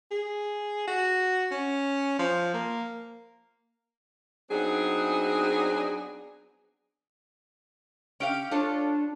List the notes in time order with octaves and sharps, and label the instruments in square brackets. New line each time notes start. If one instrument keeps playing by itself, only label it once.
[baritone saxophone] G#4
F#4
C#4
F3
A#3
[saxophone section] F#3 B3 C4 D4 D#4 G#4
[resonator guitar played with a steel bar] C#4 G4 F5 [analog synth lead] D7
[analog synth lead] D4 [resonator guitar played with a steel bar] F4 A4 C#5